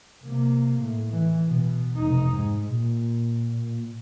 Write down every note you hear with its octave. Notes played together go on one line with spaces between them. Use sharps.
C3 A#3
A2
E3
B2
F1 D#4
G#2
A#2